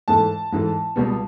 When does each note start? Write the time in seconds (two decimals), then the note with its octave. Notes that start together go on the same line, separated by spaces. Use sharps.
0.08 G#2 E3 A3 A5
0.52 G#2 E3 A3
0.96 C#2 B2 G3 B3